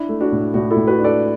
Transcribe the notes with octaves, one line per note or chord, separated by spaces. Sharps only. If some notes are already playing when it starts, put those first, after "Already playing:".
Already playing: D4 E4
A3
D4 F#4
A2
A2 D4 F#4
E4 A4
A2
F#4 B4
D4
A4 D5